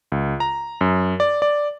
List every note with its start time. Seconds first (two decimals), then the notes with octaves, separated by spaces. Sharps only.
0.12 C#2
0.40 A#5
0.81 F#2
1.20 D5
1.42 D5